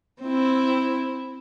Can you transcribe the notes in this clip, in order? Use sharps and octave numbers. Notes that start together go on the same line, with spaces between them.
C4 E4